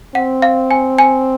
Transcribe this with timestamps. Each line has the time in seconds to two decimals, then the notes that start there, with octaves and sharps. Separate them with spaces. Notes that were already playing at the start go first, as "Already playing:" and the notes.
0.15 C4 F#5
0.42 F5
0.71 G#5
0.99 G#5